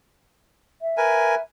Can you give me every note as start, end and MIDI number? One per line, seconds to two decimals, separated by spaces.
0.82 1.42 76
0.97 1.35 70
0.97 1.35 71
0.97 1.35 80